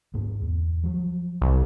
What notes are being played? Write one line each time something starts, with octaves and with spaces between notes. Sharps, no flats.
D2 G#2 A#3
E2
F3 F#3
C2